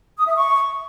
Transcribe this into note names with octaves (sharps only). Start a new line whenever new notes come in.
D#6
E5
C#6